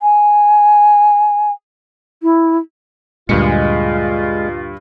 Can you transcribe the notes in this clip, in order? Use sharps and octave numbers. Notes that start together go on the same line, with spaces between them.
G#5
E4
D2 G2 A#2 G#3 F4 C#7